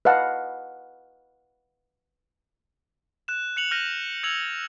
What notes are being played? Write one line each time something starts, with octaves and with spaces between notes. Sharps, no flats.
B4 D#5 F5 F#5 A5
F#6 E7
F#6 C#7 F7 F#7
F6 G6 A#6 D#7 F#7
E6 G#6 C#7 F7 F#7